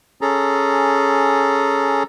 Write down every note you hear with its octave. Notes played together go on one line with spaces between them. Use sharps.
C#4 G#4 A4 A#5